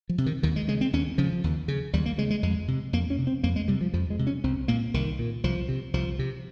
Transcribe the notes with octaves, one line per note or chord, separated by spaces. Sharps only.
F3
C3
D#3
D#2 D#3
G#3
C#3 G#3
C4
D#2 C#4
C#3 F3
D#2
C#3
D#2 G3
A#3
C#3 G#3
G#3
F2 G#3
C3
F2 A#3
C#4
C3
C4
F2 A#3
G#3
C3 G3
F3
F2 F3
G#3
C3
C#4
C2 C4
A#2 A#3
C2 D#3
A#2
C2 F3
C3
C2 F3
C3